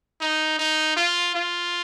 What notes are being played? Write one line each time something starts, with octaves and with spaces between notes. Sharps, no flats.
D#4
D#4
F4
F4